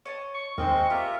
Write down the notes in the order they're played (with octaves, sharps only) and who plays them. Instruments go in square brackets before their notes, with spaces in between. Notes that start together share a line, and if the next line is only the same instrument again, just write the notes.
[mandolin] C#5 D#5 A5
[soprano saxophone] C#6
[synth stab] D#2 [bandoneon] G#3 C4 D#5 [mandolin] C5 G5 F6
[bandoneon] F4 A#4 E5 [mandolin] G4